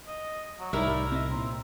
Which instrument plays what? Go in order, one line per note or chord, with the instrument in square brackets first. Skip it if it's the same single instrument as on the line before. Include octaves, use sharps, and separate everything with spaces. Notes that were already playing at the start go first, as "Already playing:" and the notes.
[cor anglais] D#5
F#3
[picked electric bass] C2 A2 [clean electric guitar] G3 D#4 D5 [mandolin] E4 A#4 [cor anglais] E5
[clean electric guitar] C4 D5 D#5
[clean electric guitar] A#2 [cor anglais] C4